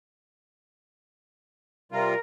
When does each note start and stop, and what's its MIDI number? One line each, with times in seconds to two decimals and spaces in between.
1.92 2.14 48
1.92 2.14 55
1.92 2.14 65
1.92 2.19 70